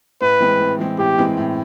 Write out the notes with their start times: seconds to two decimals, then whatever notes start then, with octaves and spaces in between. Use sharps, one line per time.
0.21 A2 B4
0.40 E3 G#3 C4
0.60 A2
0.79 E3 G#3 C4
0.98 A2 G4
1.18 E3 G#3 C4
1.37 A2